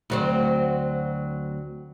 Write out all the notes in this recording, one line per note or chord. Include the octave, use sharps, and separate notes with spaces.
D2 F#3 C4